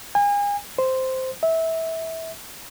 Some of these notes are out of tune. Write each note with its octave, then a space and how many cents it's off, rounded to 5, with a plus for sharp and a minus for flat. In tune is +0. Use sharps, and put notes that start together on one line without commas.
G#5 -35
C5 -5
E5 -20